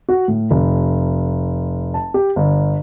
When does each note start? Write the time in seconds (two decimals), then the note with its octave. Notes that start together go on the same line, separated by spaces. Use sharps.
0.09 F#4
0.28 A2
0.51 F1
1.94 A5
2.14 G4
2.36 G1